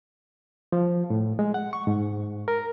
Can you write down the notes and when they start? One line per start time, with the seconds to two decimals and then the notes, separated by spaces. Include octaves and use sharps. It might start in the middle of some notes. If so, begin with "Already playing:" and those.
0.72 F3
1.10 A2
1.39 G#3
1.54 F#5
1.73 C#6
1.87 G#2
2.48 A#4